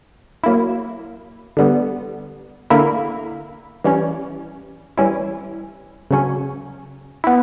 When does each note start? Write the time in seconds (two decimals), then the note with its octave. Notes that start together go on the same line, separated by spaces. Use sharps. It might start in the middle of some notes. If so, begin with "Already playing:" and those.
0.44 F#3 A#3 E4
1.57 D3 G3 B3
2.70 D3 A#3 E4
3.84 E3 G3 C#4
4.98 E3 G3 C#4 E4
6.11 C#3 F#3 C#4
7.24 B3 E4